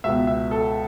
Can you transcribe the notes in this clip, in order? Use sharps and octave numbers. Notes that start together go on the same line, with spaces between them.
C#2 B2 B3 E5
E5
A4